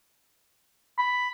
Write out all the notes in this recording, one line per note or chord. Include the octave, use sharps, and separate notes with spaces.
B5